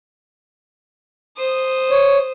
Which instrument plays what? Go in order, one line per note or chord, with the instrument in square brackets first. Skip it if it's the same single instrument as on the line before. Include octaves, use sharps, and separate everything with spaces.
[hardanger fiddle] C5 D#6
[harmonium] C#5